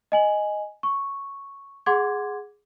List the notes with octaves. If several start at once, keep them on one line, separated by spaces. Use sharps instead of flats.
D#5 G#5 F#7
C#6
G#4 F#5 C6 D6 G#6